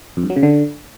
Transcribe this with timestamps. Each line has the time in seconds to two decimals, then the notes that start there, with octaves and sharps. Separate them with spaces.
0.17 F2
0.23 G2
0.30 F#3
0.36 C#3
0.43 D3